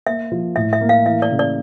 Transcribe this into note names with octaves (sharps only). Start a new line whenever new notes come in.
A#3 E5
F3
A2 E5
E5
A#3
F5
E3 E5
D5
C#3
D5